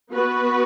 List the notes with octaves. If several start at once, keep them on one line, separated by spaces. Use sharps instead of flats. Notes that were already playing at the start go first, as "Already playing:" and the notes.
B3 F#4 B4